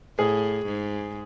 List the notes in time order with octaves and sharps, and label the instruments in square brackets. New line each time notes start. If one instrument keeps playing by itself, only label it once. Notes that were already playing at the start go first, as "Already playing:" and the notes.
[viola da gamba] A2 [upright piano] G#4
[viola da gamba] G#2